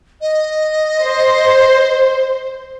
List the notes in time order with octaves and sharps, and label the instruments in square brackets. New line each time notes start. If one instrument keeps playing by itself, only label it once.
[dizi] D#5
[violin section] C5